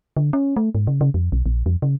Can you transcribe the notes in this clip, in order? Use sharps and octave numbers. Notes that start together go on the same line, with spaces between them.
D3
C#4
A3
G#2
C#3
C#3
F2
B1
A#1
F2
C#3